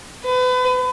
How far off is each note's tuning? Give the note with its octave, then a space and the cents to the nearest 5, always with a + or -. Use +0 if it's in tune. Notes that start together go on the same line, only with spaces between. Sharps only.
B4 +35